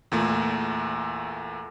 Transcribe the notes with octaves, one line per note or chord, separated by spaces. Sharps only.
E2 A#2 A3